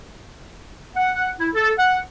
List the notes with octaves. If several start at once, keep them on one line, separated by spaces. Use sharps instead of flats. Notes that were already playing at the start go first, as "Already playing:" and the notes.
F#5
E4
A4
F#5